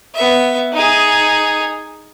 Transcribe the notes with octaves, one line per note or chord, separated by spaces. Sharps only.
B3 E5
D#4 G#4